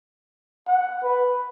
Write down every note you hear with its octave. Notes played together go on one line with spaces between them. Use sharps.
F#5
B4